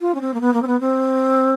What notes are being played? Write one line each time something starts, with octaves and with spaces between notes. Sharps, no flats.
F4
C#4
C4
A#3
B3
A#3
C4
B3
C4